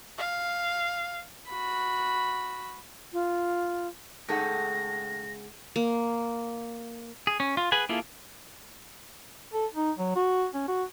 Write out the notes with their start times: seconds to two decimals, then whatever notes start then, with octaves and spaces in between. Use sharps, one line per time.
0.18 F5
1.48 F#4 B5
3.13 F4
4.28 C#2 A2 D#4 G#4 A4 F#5 A#6
5.76 A#3
7.27 G#4
7.40 C#4
7.57 F4
7.72 G#4 B4 F#5 G#5
7.89 A#3 E4 F4 G#4 A4
9.54 A4
9.74 D#4
9.99 F#3
10.15 F#4
10.54 C#4
10.68 F#4